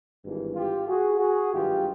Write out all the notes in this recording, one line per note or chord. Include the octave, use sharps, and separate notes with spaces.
G#1 G2 E3
F4 G4
F#4 G#4
F#4 G#4
G#1 G2 D#3 F#3 F4 G4